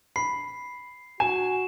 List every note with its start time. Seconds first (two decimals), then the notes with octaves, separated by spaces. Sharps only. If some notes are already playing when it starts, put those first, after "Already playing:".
0.16 B5 C7
1.20 F#4 G#5 E7